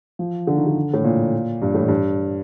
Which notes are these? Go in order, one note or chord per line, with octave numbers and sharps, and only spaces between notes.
F3
D3
D#3
D3
A2
A#2
G2
A2
G2